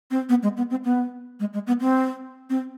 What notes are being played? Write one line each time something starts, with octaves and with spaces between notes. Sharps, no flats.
C4
B3
G#3
B3
C4
B3
G#3
G#3
B3
C4
C4